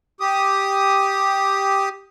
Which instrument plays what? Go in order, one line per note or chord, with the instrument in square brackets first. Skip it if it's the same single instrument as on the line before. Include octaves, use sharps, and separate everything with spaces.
[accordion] G4 D#6